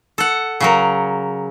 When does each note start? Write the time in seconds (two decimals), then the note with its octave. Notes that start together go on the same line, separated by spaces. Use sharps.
0.18 A4 F#5
0.60 C#3 F#3 A#4